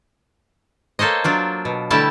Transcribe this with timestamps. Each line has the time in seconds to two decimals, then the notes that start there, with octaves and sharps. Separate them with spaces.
0.99 A#3 A4 C5 C#5 D#5
1.24 F#3 D4 F4
1.65 B2
1.90 D3 G3 A3 E4 G4 A5